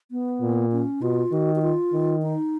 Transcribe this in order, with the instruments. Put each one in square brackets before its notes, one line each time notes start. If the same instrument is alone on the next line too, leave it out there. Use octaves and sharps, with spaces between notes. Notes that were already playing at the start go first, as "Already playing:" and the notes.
[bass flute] B3
[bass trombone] A#2
[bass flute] C#4
[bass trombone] B2 [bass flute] F4
[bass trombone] D#3 [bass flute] F#4
[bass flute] F#4
F4
[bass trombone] D#3
[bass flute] D#4